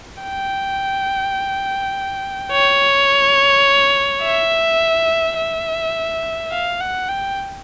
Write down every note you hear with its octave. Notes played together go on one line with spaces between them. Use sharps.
G5
C#5
E5
E5
F5
F#5
G5